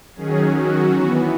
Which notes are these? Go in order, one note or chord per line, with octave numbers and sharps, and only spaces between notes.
D#3 F#3 C#4 G#4
F#4
E3 B3